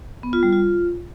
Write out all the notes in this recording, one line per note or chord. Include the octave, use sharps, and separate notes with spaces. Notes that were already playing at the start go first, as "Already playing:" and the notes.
B3
F4
G3
F4